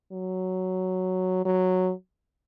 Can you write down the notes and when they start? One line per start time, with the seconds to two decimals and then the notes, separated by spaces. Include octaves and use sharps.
0.12 F#3
1.45 F#3